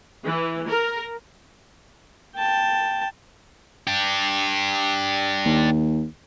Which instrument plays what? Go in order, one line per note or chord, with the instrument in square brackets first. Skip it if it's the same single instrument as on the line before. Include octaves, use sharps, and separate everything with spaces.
[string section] E3
A#4
[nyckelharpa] G5 A5
[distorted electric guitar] D4 G4
[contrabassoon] D#2